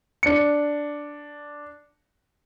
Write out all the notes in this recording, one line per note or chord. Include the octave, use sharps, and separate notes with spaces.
D4 C#7